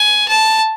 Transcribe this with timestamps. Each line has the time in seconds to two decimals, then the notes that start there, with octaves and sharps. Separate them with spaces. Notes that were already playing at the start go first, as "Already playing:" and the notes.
Already playing: G#5
0.28 A5